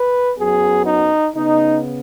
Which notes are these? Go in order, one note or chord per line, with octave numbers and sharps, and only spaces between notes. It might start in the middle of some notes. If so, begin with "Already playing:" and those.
Already playing: B4
F#2 F#3 B3 G#4
D#4
C#3 B3 D#4